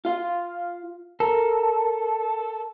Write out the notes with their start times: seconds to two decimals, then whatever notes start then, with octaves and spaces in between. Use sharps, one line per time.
0.05 F4 F5
1.20 A4 A#4